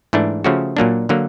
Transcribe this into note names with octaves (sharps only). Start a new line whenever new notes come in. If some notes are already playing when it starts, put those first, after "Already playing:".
G#2 E3 A3 D4
C#3 F3 A3 C#4 F#4
A#2 F#3 A#3 D4
D3 F#3 A#3